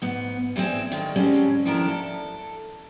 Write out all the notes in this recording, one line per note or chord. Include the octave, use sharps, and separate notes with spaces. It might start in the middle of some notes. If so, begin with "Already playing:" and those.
G#2 B3
E3 G#3 B3 C4 D4
G2 D3 D#3
G#2 D3 G3 G#3 C4 C#4
D#3 F3 D4 E4 A4 A#4
A4